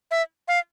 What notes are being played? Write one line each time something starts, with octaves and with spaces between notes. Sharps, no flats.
E5
F5